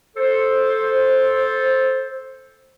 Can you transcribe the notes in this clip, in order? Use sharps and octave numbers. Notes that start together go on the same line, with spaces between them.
A4 C5